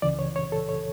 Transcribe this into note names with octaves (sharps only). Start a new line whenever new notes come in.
C#2 C#3 E3 D5
C#5
C#5
A4
C#5